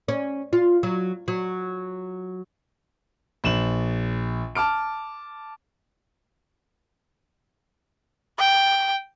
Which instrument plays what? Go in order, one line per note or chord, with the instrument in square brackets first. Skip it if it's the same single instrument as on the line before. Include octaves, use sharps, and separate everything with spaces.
[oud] C#4
F4
F#3
F#3
[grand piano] A#1 E7 F#7
A5 D6 F6 D7
[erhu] G5